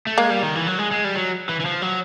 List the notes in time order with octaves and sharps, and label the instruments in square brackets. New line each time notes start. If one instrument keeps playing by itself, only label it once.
[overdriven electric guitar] A3
[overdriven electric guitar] G#3 [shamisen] A#3
[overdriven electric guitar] G3
D#3
E3
F#3
G#3
G#3
G3
F#3
E3
E3
F3
F#3